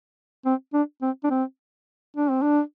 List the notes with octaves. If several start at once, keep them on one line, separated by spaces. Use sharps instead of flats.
C4
D4
C4
D4
C4
D4
C4
D4